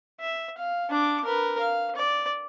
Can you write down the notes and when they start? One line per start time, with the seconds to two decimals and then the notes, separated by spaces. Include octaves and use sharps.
0.20 E5
0.57 F5
0.90 D4 D6
1.25 A#4 B4
1.60 F5
1.96 D5